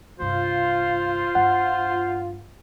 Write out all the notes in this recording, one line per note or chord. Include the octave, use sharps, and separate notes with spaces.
C2 G2 F4 C5
G2 F#5